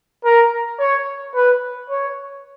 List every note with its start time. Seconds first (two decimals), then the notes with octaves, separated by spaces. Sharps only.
0.25 A#4
0.79 C#5
1.35 B4
1.90 C#5